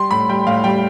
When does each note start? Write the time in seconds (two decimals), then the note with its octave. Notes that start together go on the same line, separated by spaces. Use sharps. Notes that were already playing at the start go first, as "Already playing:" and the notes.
Already playing: G3 C6
0.11 A2 B5
0.29 G3 G5
0.47 A2 F5
0.64 G3 G5